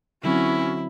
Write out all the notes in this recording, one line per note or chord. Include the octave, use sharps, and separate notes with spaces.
D3 F#3 C4 C#4 E4 F#4